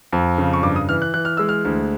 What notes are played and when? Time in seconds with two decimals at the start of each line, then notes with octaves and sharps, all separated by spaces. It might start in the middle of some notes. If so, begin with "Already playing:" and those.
0.13 F2
0.38 C#3
0.53 C#6
0.63 G2 D6
0.76 D#6
0.88 E3 F6
1.02 F#6
1.14 E3 F#6
1.25 F6
1.37 G#3 E6
1.49 F6
1.65 D2